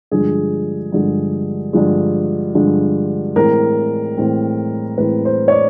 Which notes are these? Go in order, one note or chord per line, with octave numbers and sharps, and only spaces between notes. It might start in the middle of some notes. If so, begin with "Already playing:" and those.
G2 D3 F3 G#3 G#4
G2 D3 F3 G#3
G2 D3 F3 G#3
G2 D3 F3 G#3
A2 E3 G#3 C4 A#4
A2 E3 G#3 C4
A2 E3 G#3 C4 B4
C5
C#5
D5